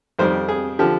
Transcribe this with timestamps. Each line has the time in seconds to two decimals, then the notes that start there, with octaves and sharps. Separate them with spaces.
0.19 F2 D#3 G3 C5
0.49 G#4
0.79 D3 F3 G4